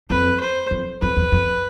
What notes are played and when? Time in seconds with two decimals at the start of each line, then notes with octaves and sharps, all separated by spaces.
0.10 F2 B4
0.41 C5
0.71 F2
1.02 F2 B4
1.16 E2
1.32 F2